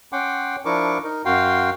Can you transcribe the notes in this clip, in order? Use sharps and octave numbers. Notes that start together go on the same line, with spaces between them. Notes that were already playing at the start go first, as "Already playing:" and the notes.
C#4 F#5 G5 C6 D6
F3 D4 E4 A#4 C#6 D6
D#4 A#4
F#2 F#4 F5 G5 C6